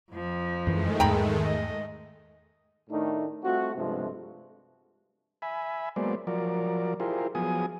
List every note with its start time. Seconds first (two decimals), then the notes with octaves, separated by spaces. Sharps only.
0.13 F2 F3
0.67 F#2 D#3 E3 G#3 A3
1.00 E2 G#2 G5 A#5 B5
1.43 D#5
2.90 A2 D#3 A3 D4 D#4
3.43 G3 A3 C4 F4 F#4
3.75 B1 G2 C3 F3 G#3 A3
5.42 E5 G#5 B5
5.96 F#3 G#3 A#3 B3 C5 D5
6.27 F3 F#3 A#4 D5
7.00 E4 F4 G4 G#4 A#4 C5
7.35 F3 F#3 B3 G#4 G#5 D#6